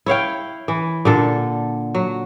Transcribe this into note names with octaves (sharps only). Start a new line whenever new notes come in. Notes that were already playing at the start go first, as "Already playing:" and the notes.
E4 C#5 F5 G5
E3
A#2 D3 A4
F#3